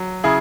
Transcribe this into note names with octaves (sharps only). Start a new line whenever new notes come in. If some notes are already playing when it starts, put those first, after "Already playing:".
Already playing: F#3
C#3 E4 G#4